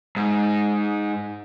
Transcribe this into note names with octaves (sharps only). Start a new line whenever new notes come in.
G#2